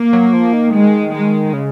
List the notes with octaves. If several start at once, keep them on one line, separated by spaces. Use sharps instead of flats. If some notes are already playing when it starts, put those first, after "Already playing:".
Already playing: A#3
F#3
F3
D#3
G#3
G#3
C#3